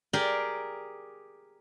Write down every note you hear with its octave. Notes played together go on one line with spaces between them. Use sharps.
G4 G#4 A#4 D5 G5